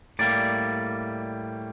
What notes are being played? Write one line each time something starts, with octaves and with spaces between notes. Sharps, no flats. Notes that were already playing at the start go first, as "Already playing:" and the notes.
A2 G3 A#3 D5